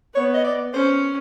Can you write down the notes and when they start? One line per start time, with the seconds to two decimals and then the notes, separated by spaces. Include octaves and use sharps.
0.14 B3 C#5
0.34 D#5
0.44 D5
0.73 C#4 C5